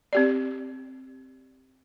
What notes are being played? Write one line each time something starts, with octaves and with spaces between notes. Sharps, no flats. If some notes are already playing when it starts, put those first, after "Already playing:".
C4 G4 D5